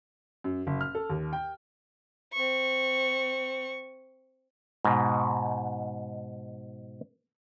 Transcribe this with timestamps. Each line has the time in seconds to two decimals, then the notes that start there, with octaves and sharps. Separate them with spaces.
0.44 F#2
0.67 F#1
0.81 F6
0.95 A4
1.10 D#2
1.33 G5
2.33 C4 C#6
4.85 G#2 B2